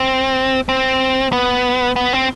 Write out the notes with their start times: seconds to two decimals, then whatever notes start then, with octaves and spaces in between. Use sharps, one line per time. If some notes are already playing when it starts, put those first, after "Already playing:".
Already playing: C4
0.69 C4
1.33 B3
1.96 B3
2.13 C4